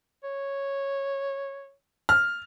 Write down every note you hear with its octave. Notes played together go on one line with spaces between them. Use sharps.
C#5
F6